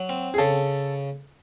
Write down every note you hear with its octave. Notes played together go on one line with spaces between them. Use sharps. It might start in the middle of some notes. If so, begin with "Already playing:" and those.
Already playing: F#3
C4
G#4
C#3 A4